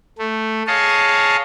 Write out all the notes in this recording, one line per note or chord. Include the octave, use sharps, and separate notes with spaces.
A3
G#4 C#5 D#5 F5 A5